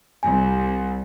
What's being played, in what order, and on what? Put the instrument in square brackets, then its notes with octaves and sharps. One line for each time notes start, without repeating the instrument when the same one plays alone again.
[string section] C2 [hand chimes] G#5